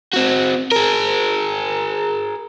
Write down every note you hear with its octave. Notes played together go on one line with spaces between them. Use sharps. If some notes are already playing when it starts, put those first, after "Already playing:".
C4 F#4
G#4 A#4